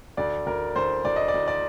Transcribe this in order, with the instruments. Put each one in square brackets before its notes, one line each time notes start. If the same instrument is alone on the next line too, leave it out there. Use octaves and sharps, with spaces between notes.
[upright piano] D2 D5
D2 A#4
D2 C5
D2 D5
D#5
D5
D2
D5